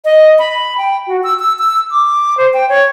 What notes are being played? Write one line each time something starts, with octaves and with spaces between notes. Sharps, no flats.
D#5
B5
G5
F#4
E6
E6
E6
D6
C5
G5
C#5